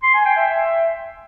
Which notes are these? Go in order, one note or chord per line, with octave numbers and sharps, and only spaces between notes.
C6
G#5
G5
E5